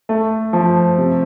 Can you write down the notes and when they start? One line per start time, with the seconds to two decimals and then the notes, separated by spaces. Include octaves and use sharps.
0.09 A3
0.53 F3
0.98 C3